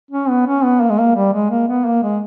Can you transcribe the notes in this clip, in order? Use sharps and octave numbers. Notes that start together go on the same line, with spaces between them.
C#4
B3
C#4
B3
A#3
G#3
A#3
G3
G#3
A#3
B3
A#3
G#3